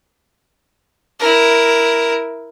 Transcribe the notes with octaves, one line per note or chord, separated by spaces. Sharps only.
E4 A#4